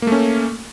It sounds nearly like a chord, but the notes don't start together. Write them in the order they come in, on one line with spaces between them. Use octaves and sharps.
A#3 A3 C#4